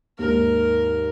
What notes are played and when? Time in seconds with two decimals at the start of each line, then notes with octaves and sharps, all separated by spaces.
0.19 D#2 G#2 A#4